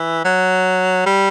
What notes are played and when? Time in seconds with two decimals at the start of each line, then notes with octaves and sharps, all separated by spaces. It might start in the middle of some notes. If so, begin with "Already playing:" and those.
Already playing: E3
0.24 F#3
1.06 G3